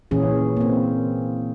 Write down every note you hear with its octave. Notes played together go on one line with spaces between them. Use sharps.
A#2 E3 C#4 G#4
A#3 C4